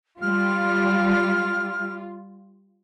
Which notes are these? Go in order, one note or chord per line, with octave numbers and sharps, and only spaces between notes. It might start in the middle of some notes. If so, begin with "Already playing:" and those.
G3 F4 F6